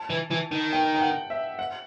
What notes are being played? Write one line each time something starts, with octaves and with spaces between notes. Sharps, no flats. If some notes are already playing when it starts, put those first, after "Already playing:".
Already playing: A5
E3
E3
D#3
G5
G5
F#5
E5
F#5